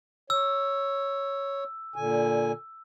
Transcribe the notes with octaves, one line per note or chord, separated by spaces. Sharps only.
C#5 E6
A#2 D3 G#5